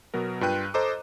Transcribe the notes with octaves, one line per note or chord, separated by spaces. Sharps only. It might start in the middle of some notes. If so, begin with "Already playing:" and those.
B2 F#3 B3 A#4
G2 F4 B4 G5 F#6 D#7
A4 C5 D#5 A#5 D6